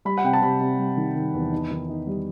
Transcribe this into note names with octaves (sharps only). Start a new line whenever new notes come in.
G3 B5
F#5
C3 G5
A5
C3 B5
C3
G3
D#3
D#3
E2
D#4
D#3
D#4
G3